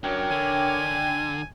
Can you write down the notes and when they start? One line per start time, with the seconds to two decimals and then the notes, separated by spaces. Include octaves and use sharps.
0.03 F#2 F#3 D4 A#4 C#5 G5
0.31 D3 G#5